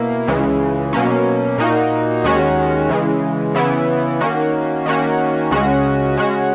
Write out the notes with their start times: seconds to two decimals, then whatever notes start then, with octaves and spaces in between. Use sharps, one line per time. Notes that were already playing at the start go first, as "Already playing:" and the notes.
Already playing: B2 A#3 E4
0.28 C#2 C#3 E3 G#3
0.93 B2 F#3 A#3 C#4
1.58 A#2 A#3 D#4 F#4
2.24 D#2 D#3 G#3 C#4 F#4
2.89 C#3 E3 G#3
3.54 C#3 E3 B3 E4
4.21 D#3 A#3 C#4 F#4
4.86 D#3 A#3 C#4 F#4
5.51 C#2 C#3 G#3 C#4 F#4
6.17 C#3 G#3 C#4 F#4